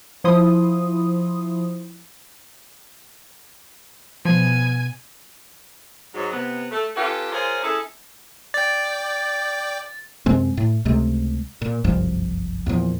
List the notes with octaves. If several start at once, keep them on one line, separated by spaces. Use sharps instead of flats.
F3 E4 C6 D#6
B2 F3 G#5
G#2 F#3
C3 B3
A3 A4
C#4 F4 G4 A4 B4
F4 G#4 A#4 C5 C#5 F5
C#4 E4 G#4 A4
D5 G5 A6
F#2 C3 G#3 C4
A2
C#2 C3 G#3 A3
A#2
F#1 C2 G2 F3
E2 A#2 F3